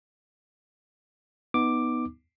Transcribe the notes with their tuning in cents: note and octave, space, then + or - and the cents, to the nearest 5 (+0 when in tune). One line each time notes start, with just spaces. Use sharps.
B3 +0 D#4 +5 D6 +5